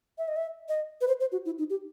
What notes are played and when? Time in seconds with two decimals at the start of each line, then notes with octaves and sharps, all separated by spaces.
0.18 E5
0.28 D#5
0.36 E5
0.69 D#5
1.01 B4
1.08 C5
1.21 C5
1.32 F#4
1.46 E4
1.58 D#4
1.70 G4